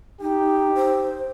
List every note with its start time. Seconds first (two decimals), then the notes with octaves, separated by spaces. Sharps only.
0.21 D#4 G4
0.75 C5